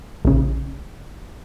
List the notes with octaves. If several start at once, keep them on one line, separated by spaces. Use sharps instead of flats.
A#1 C#3